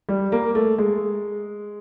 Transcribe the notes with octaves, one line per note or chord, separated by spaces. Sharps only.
G3
A#3
A3
G#3